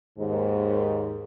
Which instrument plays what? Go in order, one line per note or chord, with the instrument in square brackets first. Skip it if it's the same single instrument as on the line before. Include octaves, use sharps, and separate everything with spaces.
[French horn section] D#2 G#2